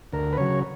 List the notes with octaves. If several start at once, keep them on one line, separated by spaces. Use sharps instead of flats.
D2 A#4
B4
C#3 F#3 C#5